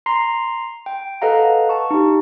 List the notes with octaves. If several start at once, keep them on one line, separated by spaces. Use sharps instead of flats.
A#5 C6 C7
G5
A4 B4 D#5 F5 F#5 A#5
A5 C#6
D#4 G4